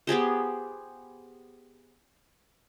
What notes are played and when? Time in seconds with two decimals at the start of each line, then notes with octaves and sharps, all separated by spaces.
0.07 B3 G4 G#4 C5